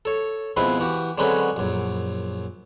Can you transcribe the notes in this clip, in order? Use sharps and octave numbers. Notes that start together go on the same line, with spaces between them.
A4 C#5
B2 F3 G#3 C4 E4 B4
E3 F#4 G4
D3 F#3 G#3 C4 C#4 B4
A#1 F#2